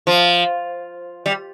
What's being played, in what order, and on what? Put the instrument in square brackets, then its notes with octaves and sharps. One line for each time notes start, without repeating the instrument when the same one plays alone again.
[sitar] F3
G3